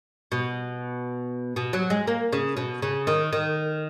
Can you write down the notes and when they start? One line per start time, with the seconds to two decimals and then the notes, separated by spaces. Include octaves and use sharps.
0.32 B2
1.56 B2
1.73 F#3
1.90 G#3
2.07 A#3
2.33 C#3
2.57 B2
2.82 C#3
3.07 D#3
3.33 D#3